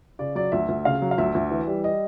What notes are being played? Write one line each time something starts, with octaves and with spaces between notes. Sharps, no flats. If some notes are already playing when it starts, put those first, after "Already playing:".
C#3 D5
F#3 D5
D2 E5
D2
C#3 F5
F#3
F5
D2 E5
D2
E3
G3
D#5